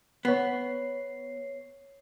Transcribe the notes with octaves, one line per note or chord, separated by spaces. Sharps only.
B3 C#5 C7